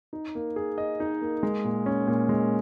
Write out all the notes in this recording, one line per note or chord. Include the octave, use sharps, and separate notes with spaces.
D#4
A#3
G#4
D#5
D#4
A#3
G#3
A#2
C#4
A#2
G#3